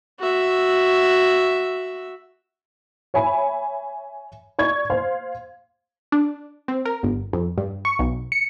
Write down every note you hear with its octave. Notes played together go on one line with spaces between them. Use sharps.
F#4 E5
C#5 E5 G#5 B5
D5 C#6 G#6
C5 F5 C6
D4
C4
A#4
G1
F2
G2
C#6
B1
C#7